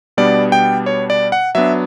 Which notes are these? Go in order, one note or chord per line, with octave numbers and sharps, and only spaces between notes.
B2 G3 B3 D4 D5
G5
C#5
D5
F#5
F#3 B3 D4 E5